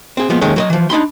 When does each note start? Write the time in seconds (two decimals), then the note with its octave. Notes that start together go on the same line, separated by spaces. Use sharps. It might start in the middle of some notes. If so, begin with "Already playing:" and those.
0.17 C4 G#4
0.30 F3 G#3 A#3 B3
0.41 D#2 D#3 G#3 A3 C#4
0.56 F#3 B4 D#5
0.70 E3 F3
0.90 D4 D#4 B5 C6